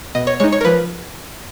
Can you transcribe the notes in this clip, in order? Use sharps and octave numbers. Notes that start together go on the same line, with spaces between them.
B2 D#5
C#5
G#3 D#4 C#5
C#5
A#4
F3 B4